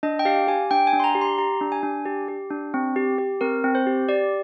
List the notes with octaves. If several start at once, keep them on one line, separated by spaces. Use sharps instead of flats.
D4 D#5
G5
G4 F5
G4 G#5
D4 G5
G#5
D4
C6
A#5
G4
C6
G4 A#5
D4
G#5
D4
G4
G4
D4
C4
G4
G4
C4 A#4
C4
C5
G4
G4 D5